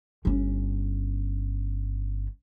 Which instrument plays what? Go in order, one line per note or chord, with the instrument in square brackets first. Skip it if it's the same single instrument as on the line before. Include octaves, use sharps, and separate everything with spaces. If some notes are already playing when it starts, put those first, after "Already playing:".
[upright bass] G1 C#4